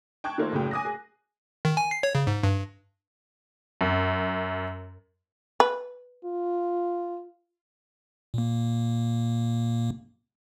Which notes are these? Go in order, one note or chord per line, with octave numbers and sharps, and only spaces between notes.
G5 A5 C#6 F#6 G#6
D#3 A3 A#3 F4 A4 C5
F#1 A2 C#3 F#3 A#3 G5
G#5 D6 D#6 F#6 A#6
G#4
D#3
G#5
C7
C#5
C#3
G#2
G2
F#2
B4
F4
A#2 A#3